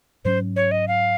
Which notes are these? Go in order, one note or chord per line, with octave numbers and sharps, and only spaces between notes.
G#2 F#3 C#4 C5
C#5
D#5
F5